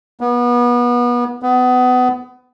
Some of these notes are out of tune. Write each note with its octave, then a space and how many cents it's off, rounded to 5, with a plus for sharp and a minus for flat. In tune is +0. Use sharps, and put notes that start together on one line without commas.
B3 -30
B3 +25